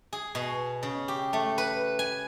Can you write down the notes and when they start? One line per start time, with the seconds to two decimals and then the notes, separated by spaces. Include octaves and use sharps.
0.13 G#4
0.35 B2
0.83 C#3
1.08 G4
1.33 A3
1.58 B4
1.99 G#5